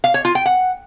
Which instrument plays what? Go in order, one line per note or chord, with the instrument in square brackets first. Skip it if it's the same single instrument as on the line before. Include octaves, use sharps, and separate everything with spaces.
[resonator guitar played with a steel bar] F5
C#5
F4
G5
F#5